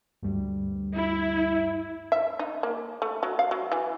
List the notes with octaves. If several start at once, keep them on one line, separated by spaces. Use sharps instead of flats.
D2 G2 G3
E4
E5
D#4
A#3
A3
F#3
F5
F#3
E3